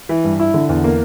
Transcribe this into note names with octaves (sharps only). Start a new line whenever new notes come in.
E3
G2
E4
D3
E2
A#3